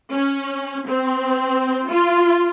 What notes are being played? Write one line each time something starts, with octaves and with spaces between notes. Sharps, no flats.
C#4
C4
F4